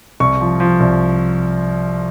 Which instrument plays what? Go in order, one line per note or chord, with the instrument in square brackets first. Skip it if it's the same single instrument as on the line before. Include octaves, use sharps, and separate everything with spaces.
[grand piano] C2 C#6
F3
F3
C2